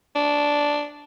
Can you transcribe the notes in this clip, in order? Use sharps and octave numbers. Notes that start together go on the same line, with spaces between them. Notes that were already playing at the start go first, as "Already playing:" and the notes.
D4